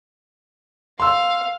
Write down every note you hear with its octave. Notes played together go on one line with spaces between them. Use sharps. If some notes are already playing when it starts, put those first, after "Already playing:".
F5 C6 E6